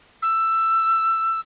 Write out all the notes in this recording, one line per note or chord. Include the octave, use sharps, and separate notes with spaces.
E6